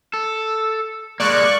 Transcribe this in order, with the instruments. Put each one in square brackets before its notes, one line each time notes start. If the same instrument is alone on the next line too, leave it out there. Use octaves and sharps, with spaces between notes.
[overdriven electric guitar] A4
[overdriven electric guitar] G#3 A#3 [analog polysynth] D5 C#6 F#6